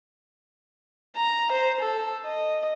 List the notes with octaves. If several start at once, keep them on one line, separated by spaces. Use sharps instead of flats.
A#5
C5
A4
D#5